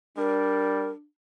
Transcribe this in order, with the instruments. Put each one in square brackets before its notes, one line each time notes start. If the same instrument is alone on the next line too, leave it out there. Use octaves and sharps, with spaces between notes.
[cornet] G3 [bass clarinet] D4 [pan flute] A#4